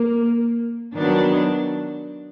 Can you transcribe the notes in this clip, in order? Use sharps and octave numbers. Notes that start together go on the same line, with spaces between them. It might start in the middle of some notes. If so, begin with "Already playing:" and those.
Already playing: A#3
D#3 F#3 B3 D4